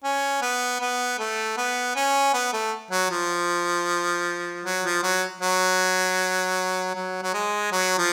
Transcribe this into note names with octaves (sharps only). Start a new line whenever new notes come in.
C#4
B3
B3
A3
B3
C#4
B3
A3
F#3
F3
F#3
F3
F#3
F#3
F#3
F#3
G#3
F#3
F3